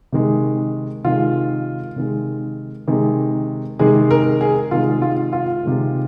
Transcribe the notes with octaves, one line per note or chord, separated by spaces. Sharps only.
C3 D#3 G#3
C3 D#3 G#3 F4
C3 D#3 G#3
C3 D#3 G#3
C3 D#3 G#3 G#4
A#4
G#4
C3 D#3 G#3 F4
F4
F4
C3 D#3 G#3